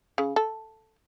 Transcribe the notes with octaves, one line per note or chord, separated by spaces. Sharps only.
C#3
A4